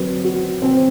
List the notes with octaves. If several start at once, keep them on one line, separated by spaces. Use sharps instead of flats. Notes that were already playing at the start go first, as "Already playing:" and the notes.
Already playing: F#3 C4 B4
F#4
C4